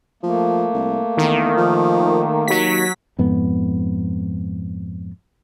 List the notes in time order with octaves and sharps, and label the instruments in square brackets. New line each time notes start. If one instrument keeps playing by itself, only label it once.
[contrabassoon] F3 [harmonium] A3 A#3
[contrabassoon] C2
[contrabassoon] E2 [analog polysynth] D#3
[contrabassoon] F3
[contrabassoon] D#2 [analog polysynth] F#3 B6
[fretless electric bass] F2 G#2 B3